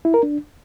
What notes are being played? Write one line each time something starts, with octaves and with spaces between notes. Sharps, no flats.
E4
A#4
D4